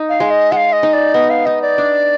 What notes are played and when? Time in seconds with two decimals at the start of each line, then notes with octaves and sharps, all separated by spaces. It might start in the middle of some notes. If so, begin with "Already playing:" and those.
Already playing: D#4
0.09 F5
0.20 G#3
0.30 D#5
0.52 G#3 F5 F#5
0.73 D#5
0.83 D#4
0.93 D5
1.14 B3 D#5
1.30 F5
1.46 D#4 D#5
1.62 D5
1.78 D4